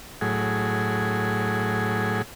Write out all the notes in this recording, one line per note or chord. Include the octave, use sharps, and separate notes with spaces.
A2 F#3 G#4